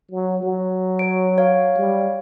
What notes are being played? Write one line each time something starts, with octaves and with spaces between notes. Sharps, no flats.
F#3
F#3
C#5 D7
C#5 F5
G3